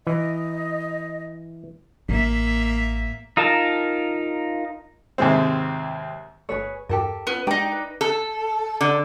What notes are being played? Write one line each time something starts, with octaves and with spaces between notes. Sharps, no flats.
E3 D#5
A1 A#3 E5
D#4 F4 A#4 A5
D#2 G#2 C3 G#3 C4
G1 A3 G#4 A4 B4 C#5
E2 G2 G4 A4 A#4
B3 C#4 F4 B4
G#3 D4 D#4 G4 D5 G5 A#5
B4
A4
D3